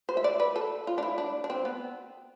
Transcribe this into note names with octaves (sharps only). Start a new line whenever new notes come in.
C5
E5
D5
B4
A4
F4
D4
E4
D4
D4
C4
B3